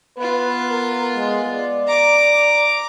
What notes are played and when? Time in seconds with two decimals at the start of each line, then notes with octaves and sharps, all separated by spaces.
0.18 B3 F4 B4
0.70 A#4
1.16 G#3
1.50 D5
1.88 A#5 D6